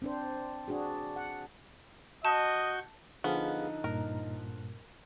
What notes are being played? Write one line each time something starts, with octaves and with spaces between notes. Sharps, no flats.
C4 D4 C5
D4 F#4 G#4
F#5
F#4 D#5 A5 C#6 G6
D3 F3 B3 D#4 G#4 F5
G2 A#2 A#4